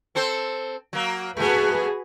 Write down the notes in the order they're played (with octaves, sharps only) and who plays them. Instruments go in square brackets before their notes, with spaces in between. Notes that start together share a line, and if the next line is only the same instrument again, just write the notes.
[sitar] C4 A4 C5
F#3 A#3
[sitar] A3 B3 [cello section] F#4 G#4 B4